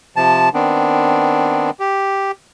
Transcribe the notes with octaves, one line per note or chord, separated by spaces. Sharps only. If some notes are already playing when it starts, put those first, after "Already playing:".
C3 F3 A5
D#3 B3 C4 D4
G4